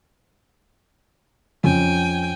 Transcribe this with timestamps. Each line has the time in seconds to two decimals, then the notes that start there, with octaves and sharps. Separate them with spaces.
1.64 F2 C#4 G5 G#5